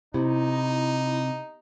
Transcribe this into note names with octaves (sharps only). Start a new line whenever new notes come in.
C3 D#4 E4